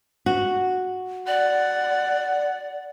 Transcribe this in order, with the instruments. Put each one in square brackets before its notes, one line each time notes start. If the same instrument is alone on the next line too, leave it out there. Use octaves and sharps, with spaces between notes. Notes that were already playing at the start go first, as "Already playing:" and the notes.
[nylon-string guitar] F#4
[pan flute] D5 [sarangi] F#5